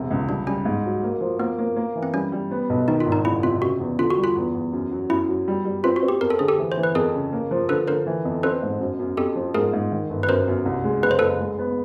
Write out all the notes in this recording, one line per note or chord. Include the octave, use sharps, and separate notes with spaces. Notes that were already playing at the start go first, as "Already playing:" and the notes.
Already playing: E1 C3
C#2
G3 D4
G3 C#4
G#2
F#3
A#3
F3
A#3 B3
A#3
A#3
E3
C4
G3 C#4
G3
B3
B1
D#3 D#4
F4
G#1
D#4
F#1 E4
C3 F4
C#3 F#4
E2
D3 F4
F#4
G3
F4
E2
E2
F#2
F#3
F#2 E4
F#3
G3
G3
C4 F4
F#4
C4
G4
F2 A#4
A4
D3 G#4
G4 A4
E3
C5
E3
B4
F2 G#4 A#4
C#3
A#3
F3
D3 A4 B4
D3 A#4 C5
E3
F2
C4 A4 B4
G#2
F#2
F#2
F2 G4 A4
F3
G#2 G#4 A#4
G#2
D#3
G1
B4
F#2 A#4 C5
F#2
C2
G#3
F#1 B4
C5
F#1 A4 B4
G#3
B3